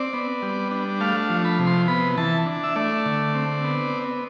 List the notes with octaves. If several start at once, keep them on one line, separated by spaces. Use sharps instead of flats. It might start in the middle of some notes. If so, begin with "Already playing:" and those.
Already playing: C4 D5
B3
G3
D4
A3 F5
F5
F3
B5
C3
C6
B3 B5
E3 A5
D4
E5
A3 D5
D3
C4
B3